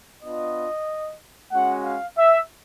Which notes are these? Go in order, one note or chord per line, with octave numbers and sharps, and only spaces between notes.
B3 D4 F4 D#5
G#3 C#4 F#4 F#5
F5
E5